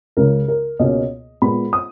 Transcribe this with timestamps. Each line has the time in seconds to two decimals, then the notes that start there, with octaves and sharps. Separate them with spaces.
0.17 C#2 C#3 G#3 A#4
0.48 A#4
0.79 C#2 B2 A#3 C#4 D#5
1.42 A#2 G#3 B3 B5
1.73 D#6